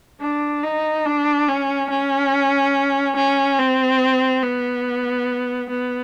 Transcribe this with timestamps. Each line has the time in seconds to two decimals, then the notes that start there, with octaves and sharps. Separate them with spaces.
0.21 D4
0.63 D#4
1.05 D4
1.48 C#4
1.90 C#4
3.16 C#4
3.58 C4
4.43 B3
5.70 B3